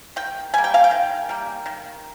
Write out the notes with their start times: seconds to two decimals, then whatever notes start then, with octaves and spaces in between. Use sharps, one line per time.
0.16 D#3 G5
0.54 G3 A#3 G#5
0.64 G5
0.74 F5
0.84 G5
0.91 D#3
1.29 G3 A#3
1.66 D#3